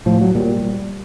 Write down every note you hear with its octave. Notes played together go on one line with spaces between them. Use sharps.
A2 F3
F#3
A#2 G3